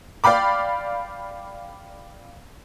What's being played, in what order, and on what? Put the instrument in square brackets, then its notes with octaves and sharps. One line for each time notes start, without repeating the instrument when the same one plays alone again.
[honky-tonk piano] D5 F5 G5 B5 D6